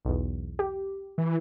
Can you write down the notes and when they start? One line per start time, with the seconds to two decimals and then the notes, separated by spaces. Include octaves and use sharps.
0.05 B1 E2
0.59 G4
1.18 E3